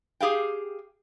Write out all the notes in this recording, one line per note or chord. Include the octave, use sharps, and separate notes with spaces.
G4 G#4 F5 G5